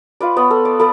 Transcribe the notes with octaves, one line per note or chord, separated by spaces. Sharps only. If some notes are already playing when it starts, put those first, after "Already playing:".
F4 B4 D5
B3 C#5
A4
D5
A4 B4 D5